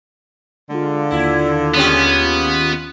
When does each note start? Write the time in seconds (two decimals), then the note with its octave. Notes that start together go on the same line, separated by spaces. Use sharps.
0.70 D3 G#3 F4
1.11 D#2 E4 F4
1.75 G#3 B3 C#4 G4